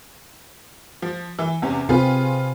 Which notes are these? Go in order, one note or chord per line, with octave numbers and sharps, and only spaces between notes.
F3
E3
E2 C3 C#4
C3 C4 F4 G#4 B4